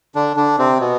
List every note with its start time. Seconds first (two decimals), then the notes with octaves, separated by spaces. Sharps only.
0.15 D3 D4
0.37 D3 D4
0.58 C3 C4
0.80 B2 B3